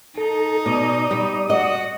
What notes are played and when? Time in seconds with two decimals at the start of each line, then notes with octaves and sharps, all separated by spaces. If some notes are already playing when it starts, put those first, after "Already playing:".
0.17 D#4 A4
0.66 B2 D5 D#6
1.11 G3
1.50 F#4 D#5 F#5